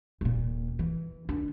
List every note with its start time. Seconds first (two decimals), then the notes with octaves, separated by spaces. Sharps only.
0.21 D#1 A#2
0.79 E3
1.29 D#3 D4